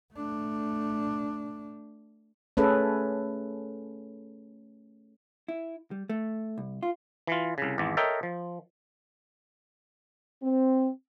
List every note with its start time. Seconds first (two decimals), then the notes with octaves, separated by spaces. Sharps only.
0.14 A3 D4
2.57 A3 C#4 G#4 A4 B4
5.48 E4
5.91 G3
6.10 A3
6.58 C2
6.83 F4
7.27 E3 F4
7.58 C2 C#3
7.78 G#1 E2
7.97 A4 A#4 C#5 D#5 E5 G5
8.23 F3
10.43 C4